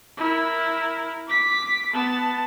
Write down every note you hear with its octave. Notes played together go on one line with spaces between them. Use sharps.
E4 A#4
D6 B6
B3 A5